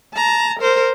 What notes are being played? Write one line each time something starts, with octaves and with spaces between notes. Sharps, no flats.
A5 A#5
A#4 C5